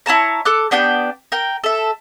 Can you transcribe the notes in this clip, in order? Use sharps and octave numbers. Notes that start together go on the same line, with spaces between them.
E4 C#5 A5 A#5
A4 D6 F#6
B3 D4 G4 G5
A#4 G5
A4 E5